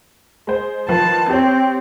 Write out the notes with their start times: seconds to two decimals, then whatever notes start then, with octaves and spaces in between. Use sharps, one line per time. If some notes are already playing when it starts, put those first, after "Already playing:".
0.47 G#3 C5
0.89 D#3 F3 B4 A5
1.29 C4 G4 C#5